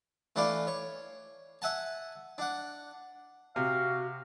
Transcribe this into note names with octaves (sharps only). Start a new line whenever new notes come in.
E3 A3 D4 E4 D5 F5
C#5
E5 F#5 G#5 A5
D4 F#5
C3 F#4 F5